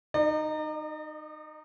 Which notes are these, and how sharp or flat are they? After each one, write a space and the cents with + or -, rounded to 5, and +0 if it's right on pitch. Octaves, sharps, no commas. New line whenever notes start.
D#4 -15 D5 +45